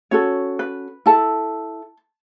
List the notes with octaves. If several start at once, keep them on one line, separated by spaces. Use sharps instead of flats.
C#4 F#4 A4 C#5
B4
E4 A4 A5